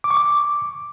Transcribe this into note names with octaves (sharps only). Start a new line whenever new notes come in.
D6
C#6
D6